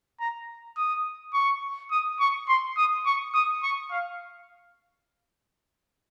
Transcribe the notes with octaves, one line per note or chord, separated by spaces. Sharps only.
A#5
D#6
C#6
D#6
C#6
C6
D#6
C#6
D#6
C#6
F5